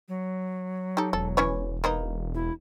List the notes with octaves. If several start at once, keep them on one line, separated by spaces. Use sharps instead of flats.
F#3
D#4 G4 A4
E1 A4
E3 C#4 C#5
A#3 B3 D#4
E4